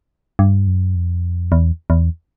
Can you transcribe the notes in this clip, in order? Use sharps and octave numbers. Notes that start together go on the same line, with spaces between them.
G2
F#2
F2
E2
E2